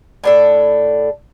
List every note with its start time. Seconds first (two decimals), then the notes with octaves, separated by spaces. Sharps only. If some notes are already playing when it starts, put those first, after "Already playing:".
0.24 A2 D4 A4